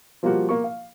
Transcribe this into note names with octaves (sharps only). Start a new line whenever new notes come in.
F3 G3 A#3 F4 F#4
A#3 C#6
F5